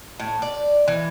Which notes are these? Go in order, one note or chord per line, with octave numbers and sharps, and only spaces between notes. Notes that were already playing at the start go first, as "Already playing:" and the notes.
A2
D5
E3